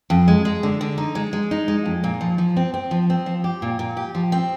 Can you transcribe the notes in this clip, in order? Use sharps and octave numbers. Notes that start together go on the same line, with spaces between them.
F2
G#3
G#3
D3
D3
D#4
G#3
G#3
D#4
G#3
F2
A#2
F3
F3
C4
C4
F3
C4
F3
G4
A#2
A#2
G4
F3
C4